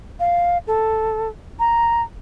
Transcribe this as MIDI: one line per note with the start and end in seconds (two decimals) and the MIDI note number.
0.20 0.58 77
0.67 1.28 69
1.59 2.02 82